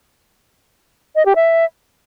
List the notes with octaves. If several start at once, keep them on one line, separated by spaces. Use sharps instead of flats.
D#5
G4
E5